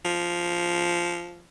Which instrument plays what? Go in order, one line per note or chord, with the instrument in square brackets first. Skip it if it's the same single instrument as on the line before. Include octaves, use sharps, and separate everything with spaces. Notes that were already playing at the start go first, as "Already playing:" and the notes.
[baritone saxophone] F3